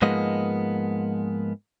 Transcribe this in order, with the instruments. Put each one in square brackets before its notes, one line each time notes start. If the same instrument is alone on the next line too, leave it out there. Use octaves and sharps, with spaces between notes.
[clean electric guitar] G#2 F3 G#3 A#3 B3 D#5